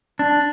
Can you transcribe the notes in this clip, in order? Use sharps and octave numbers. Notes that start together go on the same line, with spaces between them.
D4